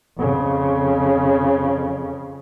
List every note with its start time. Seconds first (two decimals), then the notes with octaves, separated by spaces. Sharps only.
0.18 F2 C#3